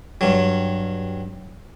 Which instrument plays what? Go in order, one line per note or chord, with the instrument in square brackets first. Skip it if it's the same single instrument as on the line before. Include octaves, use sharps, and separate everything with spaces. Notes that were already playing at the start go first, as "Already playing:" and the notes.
[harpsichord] G2 F#3